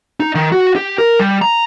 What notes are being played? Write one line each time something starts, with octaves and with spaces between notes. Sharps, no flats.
D#4
D#3
F#4
G4
A#4
G3
A#5